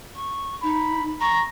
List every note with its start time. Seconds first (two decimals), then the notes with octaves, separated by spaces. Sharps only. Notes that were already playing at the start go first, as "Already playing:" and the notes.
0.15 C#6
0.63 D#4 B5
1.21 A#5 C#6